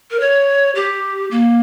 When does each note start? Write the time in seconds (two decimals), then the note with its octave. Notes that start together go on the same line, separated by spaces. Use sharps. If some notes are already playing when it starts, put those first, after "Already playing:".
0.11 A#4
0.20 C#5
0.75 G4
1.31 A#3